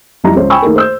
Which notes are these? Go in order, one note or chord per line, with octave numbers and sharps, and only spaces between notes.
F#1 F2 G3 E4 A#5
C#2 C5 C#5
G5 G#5 B5 C#6 E6
D#3 A3 A#3 G#4 A#4
C5 E6 G6